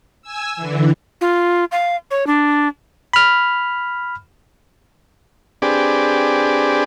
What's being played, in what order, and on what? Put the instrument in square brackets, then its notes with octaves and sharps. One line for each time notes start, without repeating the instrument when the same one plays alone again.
[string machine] G#5 E6
D3 E3
[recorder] F4
F5
C#5
D4
[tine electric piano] B5 F6
[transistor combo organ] C4 D4 G4 G#4 B4 D5